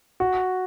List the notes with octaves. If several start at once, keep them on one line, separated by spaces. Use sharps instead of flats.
F#4